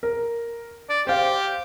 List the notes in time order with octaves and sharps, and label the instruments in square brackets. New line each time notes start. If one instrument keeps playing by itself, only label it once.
[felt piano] A#4
[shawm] D5
[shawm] G4 [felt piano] C5 F5